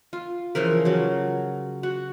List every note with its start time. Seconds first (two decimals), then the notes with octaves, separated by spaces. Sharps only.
0.13 F4
0.55 C#3 E3 F3 A#4
0.85 C#3 F#3
1.83 F#4